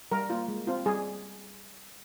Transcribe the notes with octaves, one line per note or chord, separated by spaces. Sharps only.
G3 A#4
A#3 F4
G#3
C4 F4
G3 G#4